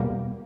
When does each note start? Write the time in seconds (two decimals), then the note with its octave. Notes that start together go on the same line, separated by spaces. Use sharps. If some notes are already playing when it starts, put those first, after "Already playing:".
Already playing: E2 B2 G3 A#3